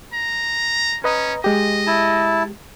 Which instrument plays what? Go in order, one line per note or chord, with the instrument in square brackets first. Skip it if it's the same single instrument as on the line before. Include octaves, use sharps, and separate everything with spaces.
[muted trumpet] A#5
[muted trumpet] C#4 [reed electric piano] B4 D#5 A#5
[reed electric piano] G#3 G4 [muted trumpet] D#5
[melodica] E4 A5